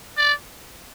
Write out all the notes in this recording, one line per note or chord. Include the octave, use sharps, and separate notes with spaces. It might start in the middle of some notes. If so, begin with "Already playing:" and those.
D5